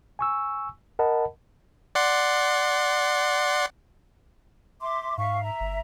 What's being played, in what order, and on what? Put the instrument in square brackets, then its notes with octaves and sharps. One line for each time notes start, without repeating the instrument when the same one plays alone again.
[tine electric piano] G#5 C#6 E6
A#4 D#5 F#5 A5 B5
[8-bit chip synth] D5 F#5 C6
[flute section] E5 C6 D6
[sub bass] G#2 [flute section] E5 F5 C#6
[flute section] E5 A#5
[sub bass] G1